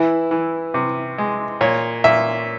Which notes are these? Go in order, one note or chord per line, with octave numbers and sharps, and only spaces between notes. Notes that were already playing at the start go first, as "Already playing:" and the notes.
Already playing: E3 E4
E3
C3
G#3
A#2 C#5
A#2 E5